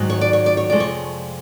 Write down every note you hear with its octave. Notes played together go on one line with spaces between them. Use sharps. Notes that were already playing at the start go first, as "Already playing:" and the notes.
Already playing: G#2 D#3 F#3
C#5
D5
C#5
D5
C#5
F2 C3 F3 G#3 D5
C#5